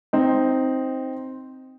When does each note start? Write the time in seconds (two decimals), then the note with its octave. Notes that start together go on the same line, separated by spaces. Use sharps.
0.13 C4 D#4